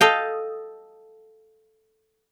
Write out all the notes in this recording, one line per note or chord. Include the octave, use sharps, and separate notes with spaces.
A4 D#5 F5 G5